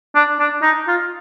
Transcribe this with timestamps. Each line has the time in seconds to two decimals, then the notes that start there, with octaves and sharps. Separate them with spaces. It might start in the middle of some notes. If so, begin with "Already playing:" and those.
0.15 D4
0.40 D4
0.63 D#4
0.88 F4